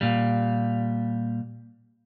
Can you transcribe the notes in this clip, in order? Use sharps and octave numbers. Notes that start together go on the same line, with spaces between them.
A#2 G3